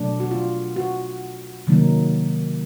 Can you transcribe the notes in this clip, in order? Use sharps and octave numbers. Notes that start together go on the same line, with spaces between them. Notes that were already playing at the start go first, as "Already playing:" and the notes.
Already playing: B2 F#3 A3 D4
F#4
F4
F#4
C3 D#3 F#3 A#3 D#4